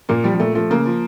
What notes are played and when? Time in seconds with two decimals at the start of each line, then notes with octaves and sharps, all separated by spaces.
0.09 A#2 A#3
0.24 F3 G3
0.35 G3
0.40 A#2 A3
0.55 F3 A3
0.70 C#3 A#3
0.86 F3